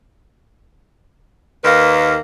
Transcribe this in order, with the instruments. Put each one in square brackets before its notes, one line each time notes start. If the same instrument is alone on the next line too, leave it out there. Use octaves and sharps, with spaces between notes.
[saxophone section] D#2 D#3 A#3 B4